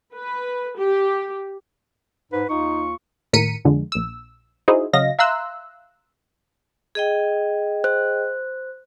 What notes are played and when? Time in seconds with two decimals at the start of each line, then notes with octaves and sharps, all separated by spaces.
0.15 B4
0.77 G4
2.32 G#2 B4
2.49 D#2 D#4 F4 C#6
3.33 D#2 A2 A#4 B6 C#7 D#7
3.65 F2 D3 G#3
3.92 A#1 E6
4.68 D#4 E4 F#4 G#4 C5
4.93 C#3 F#3 D#5 F5 A#6
5.19 E5 F5 A#5 C6 E6 F#6
6.95 G#4 D#5 G5
7.84 C5 F#6